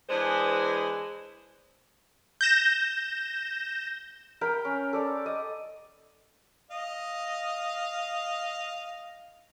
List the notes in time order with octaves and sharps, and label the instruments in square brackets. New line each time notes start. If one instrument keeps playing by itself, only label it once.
[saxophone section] E3 G#3 D4 G#4 B4 C5
[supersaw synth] G6 A#6 E7
[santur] A#4 G5 B5
C#4
A4 D5
D#5
[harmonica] D#5 F5